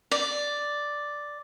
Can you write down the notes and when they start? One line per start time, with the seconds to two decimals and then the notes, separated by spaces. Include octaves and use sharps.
0.11 D5